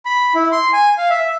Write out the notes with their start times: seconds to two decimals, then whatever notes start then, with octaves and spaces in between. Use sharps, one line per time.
0.05 B5
0.35 E4
0.52 C6
0.73 G#5
0.98 F5
1.10 E5